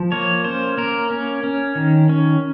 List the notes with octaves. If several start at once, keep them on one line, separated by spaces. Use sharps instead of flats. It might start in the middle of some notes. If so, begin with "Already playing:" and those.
Already playing: F3
A#3 C#5
C#4 C5
A#3 A#4
C#4
C#4
D#3
C#4